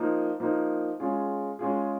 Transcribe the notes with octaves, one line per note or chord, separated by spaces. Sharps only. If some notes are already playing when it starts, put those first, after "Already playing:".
Already playing: F3 A#3 D#4
F3 A#3 D#4
G#3 C#4 F4 G#4
G#3 C#4 F4 G#4